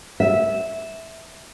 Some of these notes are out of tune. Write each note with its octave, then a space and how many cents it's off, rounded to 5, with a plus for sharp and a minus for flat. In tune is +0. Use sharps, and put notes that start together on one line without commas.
E5 -10